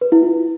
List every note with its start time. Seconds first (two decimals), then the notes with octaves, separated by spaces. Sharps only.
0.01 B4
0.12 E4
0.23 F4